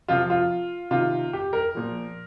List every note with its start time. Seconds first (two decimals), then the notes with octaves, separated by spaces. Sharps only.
0.08 C3 F3 F4
0.30 F4
0.91 C3 D#3 F4
1.33 G4
1.53 A#4
1.75 A#2 F3